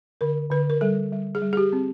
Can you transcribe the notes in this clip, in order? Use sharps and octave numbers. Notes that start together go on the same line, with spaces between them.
D3 A#4
D3 B4
A#4
G3 A4
G3
G#4
G3
G#4
G4
C4